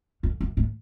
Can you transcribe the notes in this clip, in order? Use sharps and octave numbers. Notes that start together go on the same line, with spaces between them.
F2
F#2
A2